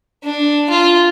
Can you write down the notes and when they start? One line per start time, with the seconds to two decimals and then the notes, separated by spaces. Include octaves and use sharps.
0.24 D4
0.70 F4